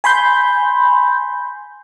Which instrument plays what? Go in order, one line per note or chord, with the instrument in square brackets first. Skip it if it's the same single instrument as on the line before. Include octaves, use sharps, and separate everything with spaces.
[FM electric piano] G#5 B5 C6 G6